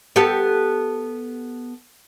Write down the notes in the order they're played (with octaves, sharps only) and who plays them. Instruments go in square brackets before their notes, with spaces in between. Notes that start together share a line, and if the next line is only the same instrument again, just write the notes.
[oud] B3 G4 A4